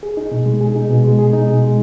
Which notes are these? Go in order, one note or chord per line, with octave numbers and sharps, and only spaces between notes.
G#4
D#4
B2
G#3
G#4
D#4
B2
G#3
G#4
D#4
B2
G#3